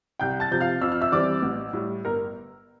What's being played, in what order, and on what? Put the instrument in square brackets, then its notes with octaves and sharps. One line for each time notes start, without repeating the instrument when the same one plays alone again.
[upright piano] C2 G5 G6
A5 A6
C3 F3 G6
F5 F6
F2 E6
F6
E5 E6
E3 G3 C4 D5 D6
A1
A2 G3
G1 A#4 A#5